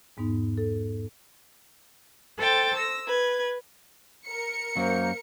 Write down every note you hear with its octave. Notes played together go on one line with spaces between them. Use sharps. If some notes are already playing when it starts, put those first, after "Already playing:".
E2 G#2 B3 D#4
A4
A4 C5 G5 A6
E6 A#6
B4 G#6
A#4 C#7
F#2 F#3 A#3 C5